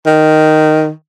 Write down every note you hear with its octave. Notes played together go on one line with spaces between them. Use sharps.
D#3